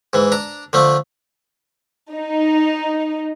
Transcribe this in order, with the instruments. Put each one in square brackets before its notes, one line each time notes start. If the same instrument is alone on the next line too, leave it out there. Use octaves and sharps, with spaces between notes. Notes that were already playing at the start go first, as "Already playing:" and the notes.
[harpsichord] G#2 E3
D4 A#5
D3 F3 A3
[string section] D#4